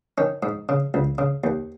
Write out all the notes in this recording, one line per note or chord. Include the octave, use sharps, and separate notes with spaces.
D#3 C#4
G#2
C#3
C#2
C#3
D#2